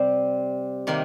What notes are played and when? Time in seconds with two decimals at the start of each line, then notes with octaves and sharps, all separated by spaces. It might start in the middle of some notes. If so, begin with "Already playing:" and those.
Already playing: C3 G3 C4
0.87 C3 D#3 A#3